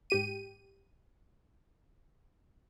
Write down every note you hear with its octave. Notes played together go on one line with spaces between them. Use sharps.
G#2 G4 D#7